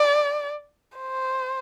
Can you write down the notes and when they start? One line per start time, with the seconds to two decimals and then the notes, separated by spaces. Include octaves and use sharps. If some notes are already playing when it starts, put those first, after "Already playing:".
Already playing: D5
0.97 C5